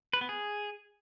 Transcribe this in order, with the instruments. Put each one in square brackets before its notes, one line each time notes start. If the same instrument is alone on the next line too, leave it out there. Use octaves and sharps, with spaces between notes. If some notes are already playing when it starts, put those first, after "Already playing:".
[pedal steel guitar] B4
B3
G#4